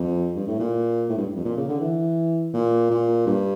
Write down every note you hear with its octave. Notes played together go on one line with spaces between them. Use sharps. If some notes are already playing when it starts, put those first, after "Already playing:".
Already playing: F2
G2
A2
A#2
A2
G2
F2
A#2
C#3
D3
E3
A#2
A#2
G2